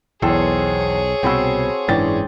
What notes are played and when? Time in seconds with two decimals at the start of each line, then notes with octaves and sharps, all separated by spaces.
0.22 B1 E2 G#4 A4 C5 C#5 G5
1.23 C2 B2 C4 F#4 G5 B5 C6 E6
1.88 F#1 G#2 C#3 E3 D4 D5 G5 A6